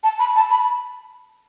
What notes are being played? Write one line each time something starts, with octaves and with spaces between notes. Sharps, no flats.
A5
B5
A5
B5